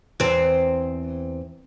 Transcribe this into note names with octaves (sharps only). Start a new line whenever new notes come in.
E2 C4